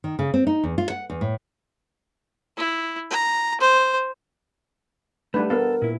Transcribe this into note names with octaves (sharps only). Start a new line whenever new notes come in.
D#3
C#3
C4
D#4
E2
F4
F#5
E2
A2
E4
A#5
C5
G3 A3 D4 D#4 B4
B3 A4 A#4 F5
A#2 E4